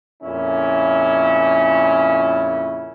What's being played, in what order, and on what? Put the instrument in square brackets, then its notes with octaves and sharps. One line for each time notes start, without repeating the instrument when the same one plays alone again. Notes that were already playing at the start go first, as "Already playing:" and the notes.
[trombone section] F2 A#2 C#3 C#4 E4